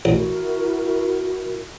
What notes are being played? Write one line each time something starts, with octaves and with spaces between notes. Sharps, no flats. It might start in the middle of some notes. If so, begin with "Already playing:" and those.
A1 E4 F#4 A#4